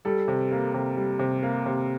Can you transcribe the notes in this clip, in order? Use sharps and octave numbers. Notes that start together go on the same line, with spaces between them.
G3 A4
C3
A#3
C3
G3
C3
A#3
C3